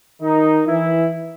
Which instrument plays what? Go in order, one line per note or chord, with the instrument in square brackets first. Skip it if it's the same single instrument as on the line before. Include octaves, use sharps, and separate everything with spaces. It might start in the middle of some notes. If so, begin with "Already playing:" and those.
[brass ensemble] D#3 D#4
E3 E4